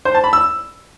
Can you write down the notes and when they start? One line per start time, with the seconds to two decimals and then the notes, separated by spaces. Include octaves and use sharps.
0.05 C5
0.15 A5
0.24 B5
0.33 E6